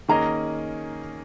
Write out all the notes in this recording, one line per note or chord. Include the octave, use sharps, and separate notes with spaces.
D#3 A#3 C#4 G#4 D#5 A#5